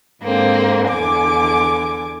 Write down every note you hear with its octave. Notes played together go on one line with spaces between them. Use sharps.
G#2 D3 A#3 C4
E2 D3 G#5 D6